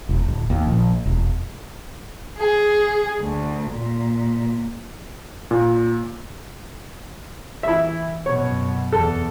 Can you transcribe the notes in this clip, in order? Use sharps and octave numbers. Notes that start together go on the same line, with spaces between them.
E1
D1
D#2
A#1
E1
G#4
D2
A#2
A#2
E3 E4 E5
F#2 B2 C#5
E2 A4